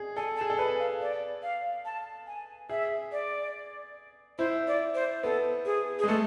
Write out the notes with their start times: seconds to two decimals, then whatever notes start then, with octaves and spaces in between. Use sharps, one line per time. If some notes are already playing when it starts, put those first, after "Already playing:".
Already playing: G#4
0.17 A4 G#5
0.37 A5
0.41 G#4
0.50 A4
0.59 B4 G#5
0.79 F5
1.01 D5
1.43 F5
1.85 A5
2.27 G#5
2.70 G#4 E5
3.12 D5
4.38 E4 C5
4.67 D5
4.95 C5
5.23 B3 A4
5.66 G#4
5.99 G#3 G#4
6.08 A3 A4